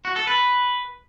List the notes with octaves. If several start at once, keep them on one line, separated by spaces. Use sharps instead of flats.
F#4
A4
B4